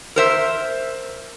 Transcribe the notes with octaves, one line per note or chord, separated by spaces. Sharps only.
A#4 C5 E5